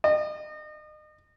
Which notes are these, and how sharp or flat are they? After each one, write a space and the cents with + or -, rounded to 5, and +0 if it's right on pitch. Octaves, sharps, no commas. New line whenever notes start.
D#5 -35